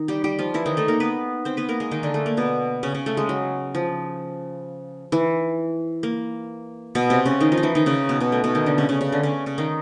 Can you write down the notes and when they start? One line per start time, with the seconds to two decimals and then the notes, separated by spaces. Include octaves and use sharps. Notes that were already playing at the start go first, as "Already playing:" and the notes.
Already playing: D#3 D#4
0.08 G3 G4
0.24 G3 G4
0.39 F3 F4
0.54 E3 E4
0.66 D#3 D#4
0.77 A3 A4
0.88 A#3 A#4
1.00 B3 B4
1.45 C4 C5
1.57 B3 B4
1.69 A#3 A#4
1.80 G#3 G#4
1.91 D#3 D#4
2.03 D3 D4
2.14 A3
2.26 A#3
2.37 B2 B3
2.83 C#3 C#4
2.95 C#3 C#4
3.06 A3
3.17 G#3
3.29 F#3
3.75 F3
5.12 E3
6.03 A#3
6.95 B2 B3
7.10 C3 C4
7.26 C#3 C#4
7.41 D#3 D#4
7.52 F3 F4
7.57 D#4
7.63 E3 E4
7.75 D#3 D#4
7.86 C#3 C#4
8.09 B2 B3
8.20 B2 B3
8.32 A3
8.44 B2 B3
8.55 D#3 D#4
8.66 D3 D4
8.78 C#3 C#4
8.89 C#3 C#4
9.01 C#3 C#4
9.12 D3 D4
9.23 C#3 C#4
9.46 C#3 C#4
9.58 D#3 D#4